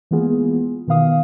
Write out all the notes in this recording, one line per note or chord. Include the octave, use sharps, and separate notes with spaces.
E3 G#3 A#3 B3 F4 G#4
B2 D#3 B3 F5 D#6